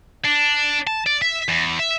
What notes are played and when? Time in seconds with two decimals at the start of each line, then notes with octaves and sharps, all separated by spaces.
0.25 D4
0.87 A5
1.06 D5
1.22 E5
1.48 E2
1.79 E5